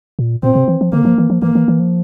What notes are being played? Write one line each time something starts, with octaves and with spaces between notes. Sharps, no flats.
A#2
A#2 C4
C3
E3
F3
D3 A#3
F3
E3
F3
E3 A#3
E3
E3
F3